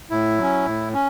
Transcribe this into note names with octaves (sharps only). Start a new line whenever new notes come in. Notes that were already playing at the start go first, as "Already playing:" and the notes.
A2 E4
F#3 C#4
A2
C#4